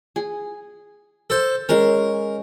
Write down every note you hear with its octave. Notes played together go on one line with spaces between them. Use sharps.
G#4
A4 C5
G#3 C#4 A#4